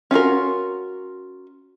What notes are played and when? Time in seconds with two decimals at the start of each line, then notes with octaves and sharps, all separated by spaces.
0.11 C#4 F4 F#4 A#4